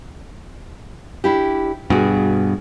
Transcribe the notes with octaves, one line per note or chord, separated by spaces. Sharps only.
D4 E4 G4
G2 B2 F#4 G#4